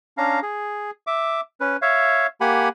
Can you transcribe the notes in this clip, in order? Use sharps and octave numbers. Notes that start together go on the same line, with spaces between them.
C#4 D4 F5 A#5
G#4
E5 D6
C#4 B4
C#5 E5 F5
A#3 G4 F#5 G#5 B5